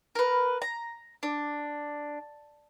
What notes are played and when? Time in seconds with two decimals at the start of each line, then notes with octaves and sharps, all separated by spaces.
0.15 A#4 B4
0.62 A#5
1.23 D4